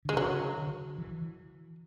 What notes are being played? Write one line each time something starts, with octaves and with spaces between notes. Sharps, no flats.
D3 G#3
C#3 F#3
D3
E3